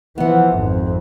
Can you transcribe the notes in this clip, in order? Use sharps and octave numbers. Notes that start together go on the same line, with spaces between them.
E3 F3 B3 F#5
G#1 F2